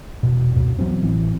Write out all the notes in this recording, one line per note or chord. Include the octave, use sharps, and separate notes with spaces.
E1 B2
C#2 F#2 B2
E3 F#3 B3 C4
A1 E3 C4